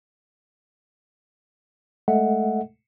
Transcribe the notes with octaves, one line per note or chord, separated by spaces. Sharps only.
G#3 A3 A4 D#5 E5 F#5